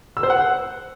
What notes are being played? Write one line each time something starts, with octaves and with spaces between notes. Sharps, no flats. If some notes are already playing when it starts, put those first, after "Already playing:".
E6
C5
F#5